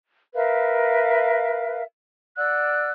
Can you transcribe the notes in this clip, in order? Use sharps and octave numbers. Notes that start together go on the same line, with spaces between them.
A#4 B4 E5 F5
D5 F#5 E6 F#6